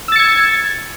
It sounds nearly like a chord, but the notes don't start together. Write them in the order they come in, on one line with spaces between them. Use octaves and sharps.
E6 A6 C#7 G#6